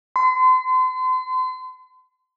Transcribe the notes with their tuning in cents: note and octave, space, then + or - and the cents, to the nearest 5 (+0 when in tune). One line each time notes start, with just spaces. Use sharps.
C6 -40